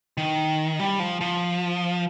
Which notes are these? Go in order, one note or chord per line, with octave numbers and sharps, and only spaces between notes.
D#3
G3
F3
F3